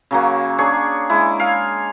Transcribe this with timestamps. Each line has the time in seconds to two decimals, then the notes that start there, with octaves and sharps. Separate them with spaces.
0.11 C#3 F#3 A#3
0.58 D4 G#4 C#5
1.10 G#3 E4
1.40 F5 G#5